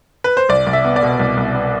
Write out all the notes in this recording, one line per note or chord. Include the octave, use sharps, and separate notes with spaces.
B4
C5
C2 D5
C2
E5
B3
D5
B2
C2
C2
B3